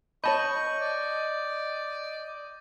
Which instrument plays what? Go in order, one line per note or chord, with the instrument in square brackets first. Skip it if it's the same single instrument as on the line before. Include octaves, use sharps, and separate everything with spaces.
[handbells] C#5 A5 B5 [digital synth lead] D#5 [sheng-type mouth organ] C#6 [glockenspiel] G6 A#6 F#7
[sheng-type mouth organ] D5